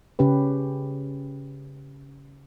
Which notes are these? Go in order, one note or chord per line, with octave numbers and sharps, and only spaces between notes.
C#3 C#4 G4 B4